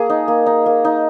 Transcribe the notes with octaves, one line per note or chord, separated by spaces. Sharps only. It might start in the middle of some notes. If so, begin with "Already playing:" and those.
Already playing: A#3 G#4
D#4
A#3
D#4
A#3
D#4